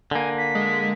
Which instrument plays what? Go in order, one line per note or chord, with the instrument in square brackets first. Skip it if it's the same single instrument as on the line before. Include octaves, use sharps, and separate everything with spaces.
[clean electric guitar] D3 A#3 [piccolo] G#5
[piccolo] B6
[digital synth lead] G#3